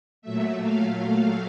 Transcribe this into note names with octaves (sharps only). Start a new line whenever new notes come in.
A#2 F#3 A3 E5
F5
F5